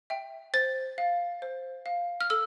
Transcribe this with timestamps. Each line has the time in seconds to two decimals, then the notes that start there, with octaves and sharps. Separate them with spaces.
0.10 E5 G5
0.54 C5 A6
0.98 F5
1.42 C5
1.86 F5
2.21 F6
2.30 A4 E6